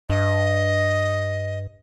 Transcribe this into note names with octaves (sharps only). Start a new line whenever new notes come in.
G2 D#5